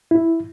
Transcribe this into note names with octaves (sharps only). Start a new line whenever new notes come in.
E4